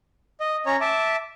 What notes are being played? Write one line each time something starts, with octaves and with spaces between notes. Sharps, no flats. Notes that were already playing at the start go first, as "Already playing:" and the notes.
D#5
C#4 C#5 A#5
E5 A5 D6